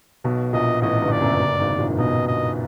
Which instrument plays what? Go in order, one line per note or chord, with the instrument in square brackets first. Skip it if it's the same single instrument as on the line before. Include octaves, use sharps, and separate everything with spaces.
[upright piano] B1 B2
[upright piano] A#1 A#2 [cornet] D#5
[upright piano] A1 A2 [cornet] D#5
[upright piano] G1 G2
[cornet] D5
[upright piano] F#1 F#2
F#1 F#2
G2
G#1 G#2
A#1 A#2
[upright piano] B1 B2 [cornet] D#5
[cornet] D#5